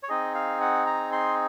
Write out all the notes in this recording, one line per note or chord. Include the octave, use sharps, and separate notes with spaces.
C#5
C4 D#4 G#4 D#5
F5
F#5
A#5
C6